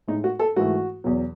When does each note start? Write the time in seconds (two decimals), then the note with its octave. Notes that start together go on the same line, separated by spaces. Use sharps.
0.08 A2 G#3 D#4
0.24 F#4
0.39 A4
0.56 G#2 E3 A3 F#4
1.04 E2 B2 F#3